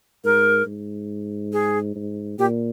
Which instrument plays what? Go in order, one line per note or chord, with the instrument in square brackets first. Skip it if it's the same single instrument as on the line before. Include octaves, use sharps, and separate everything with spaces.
[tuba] G#2 [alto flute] A#4
[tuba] G#2
[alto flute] G#4
[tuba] G#2
[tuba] A#2 [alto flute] G4